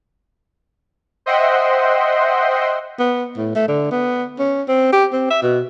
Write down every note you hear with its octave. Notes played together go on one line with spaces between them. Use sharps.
C5 D#5 E5 F#5 G5 C6
B3
A2
A3
D3
B3
C#4
C4
G4
C4
E5
B2